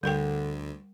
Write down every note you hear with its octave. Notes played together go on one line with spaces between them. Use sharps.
D2 D3 G3 A#4 G5